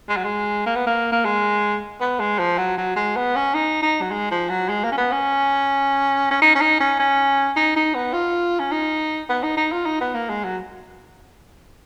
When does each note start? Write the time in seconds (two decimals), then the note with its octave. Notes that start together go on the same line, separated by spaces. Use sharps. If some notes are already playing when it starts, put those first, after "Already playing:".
0.09 G#3
0.16 F#3
0.24 G#3
0.66 A#3
0.76 B3
0.86 A#3
1.12 A#3
1.25 G#3
2.01 B3
2.20 G#3
2.39 F3
2.58 F#3
2.78 F#3
2.96 G#3
3.16 B3
3.35 C#4
3.54 D#4
3.82 D#4
4.01 F#3
4.11 G#3
4.31 F3
4.49 F#3
4.69 G#3
4.84 A#3
4.92 C#4
4.97 B3
5.12 C#4
6.31 C#4
6.42 D#4
6.55 C#4
6.61 D#4
6.80 C#4
6.99 C#4
7.56 D#4
7.76 D#4
7.94 B3
8.13 F4
8.59 C#4
8.71 D#4
9.29 B3
9.43 D#4
9.57 D#4
9.72 F4
9.85 D#4
10.01 B3
10.14 A#3
10.29 G#3
10.44 F#3